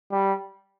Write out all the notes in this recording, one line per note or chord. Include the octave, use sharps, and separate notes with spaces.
G3